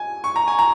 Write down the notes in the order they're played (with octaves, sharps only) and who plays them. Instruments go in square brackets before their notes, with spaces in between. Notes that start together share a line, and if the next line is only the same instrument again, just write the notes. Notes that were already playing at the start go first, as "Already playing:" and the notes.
Already playing: [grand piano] G#5
C#6
A#5
G#5
A#5